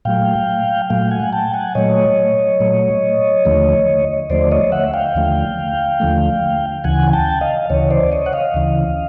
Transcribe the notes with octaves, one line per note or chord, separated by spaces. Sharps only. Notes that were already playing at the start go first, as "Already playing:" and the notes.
A#2 F#3 A3 F5 G5
A#2 F#3 A3 F5 G5
F#5 G#5
G5 A5
F#5 G#5
A#2 F#3 A3 C#5 D#5
A#2 F#3 A3
D#2 D3 F3 A3
D#2 D3 F3 A3 C5 D5
C#5 D#5
E5 F#5
F5 G5
D#2 D3 F3 A3
D#2 D3 F3 A3
D2 C#3 E3 F#5 G#5
G5 A5
D#5 F5
D2 C#3 E3 C#5 D#5
C5 D5
C#5 D#5
F#5
D#5 F5
D2 C#3 E3